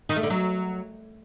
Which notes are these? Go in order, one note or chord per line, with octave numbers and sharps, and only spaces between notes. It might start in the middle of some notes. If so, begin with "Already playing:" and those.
D#3
A3
D3
F#3